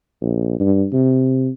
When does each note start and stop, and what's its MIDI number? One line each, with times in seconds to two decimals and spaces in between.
0.21 0.56 34
0.60 0.86 43
0.92 1.49 48